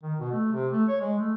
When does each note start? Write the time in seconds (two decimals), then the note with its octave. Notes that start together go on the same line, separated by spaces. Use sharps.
0.03 D#3
0.19 B2
0.32 A3
0.52 C3
0.73 A3
0.88 C#5
1.01 G#3
1.19 A3